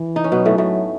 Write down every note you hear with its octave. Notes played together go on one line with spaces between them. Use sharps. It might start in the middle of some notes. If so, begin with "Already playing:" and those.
Already playing: E3
D#4
C#4
B2 F#3 B3
A2 A3
A2 A3